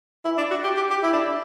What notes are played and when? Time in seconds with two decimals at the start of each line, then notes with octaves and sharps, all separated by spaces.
0.25 E4
0.38 D4
0.51 F#4
0.64 G4
0.76 G4
0.90 G4
1.03 E4
1.13 D4